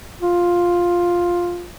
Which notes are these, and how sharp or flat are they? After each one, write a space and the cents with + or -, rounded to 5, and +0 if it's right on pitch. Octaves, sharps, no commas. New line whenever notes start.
F4 +5